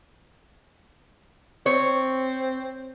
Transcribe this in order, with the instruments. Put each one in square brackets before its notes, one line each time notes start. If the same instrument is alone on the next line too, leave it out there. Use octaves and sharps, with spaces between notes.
[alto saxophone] C4 [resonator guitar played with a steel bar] C#5